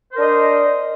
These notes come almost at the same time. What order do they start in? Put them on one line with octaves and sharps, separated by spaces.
C5 A#4 D4 D#5